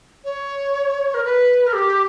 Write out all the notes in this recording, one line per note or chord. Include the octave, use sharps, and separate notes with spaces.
C#5
A#4
B4
A#4
G4